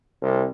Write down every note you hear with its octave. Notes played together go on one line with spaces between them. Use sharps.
C2